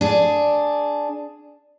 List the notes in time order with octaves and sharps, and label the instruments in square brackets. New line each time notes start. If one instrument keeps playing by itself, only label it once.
[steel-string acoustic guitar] D4 G#4